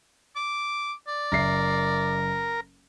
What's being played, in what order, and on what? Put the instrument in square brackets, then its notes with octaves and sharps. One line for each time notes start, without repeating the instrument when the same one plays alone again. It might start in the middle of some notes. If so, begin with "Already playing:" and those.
[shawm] D6
D5
[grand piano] F#1 E5 C7 [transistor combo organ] A#4